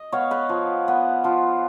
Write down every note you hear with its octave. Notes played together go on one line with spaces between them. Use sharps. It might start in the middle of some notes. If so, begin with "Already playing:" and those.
Already playing: D#5
B3 C#5 F5
B4 D#5
F3
B3
F3 F4